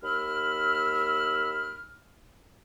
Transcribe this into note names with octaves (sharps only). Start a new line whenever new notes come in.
D#2 B5 E6 F6